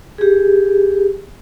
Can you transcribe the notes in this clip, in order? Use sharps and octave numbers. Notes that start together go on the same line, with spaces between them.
G4 G#4